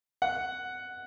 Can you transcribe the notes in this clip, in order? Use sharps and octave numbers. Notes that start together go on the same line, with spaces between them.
F#5